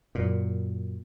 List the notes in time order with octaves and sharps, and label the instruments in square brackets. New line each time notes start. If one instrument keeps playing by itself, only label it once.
[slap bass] F#2 A#2